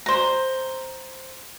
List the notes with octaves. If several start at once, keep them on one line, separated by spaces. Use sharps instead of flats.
C5 A#5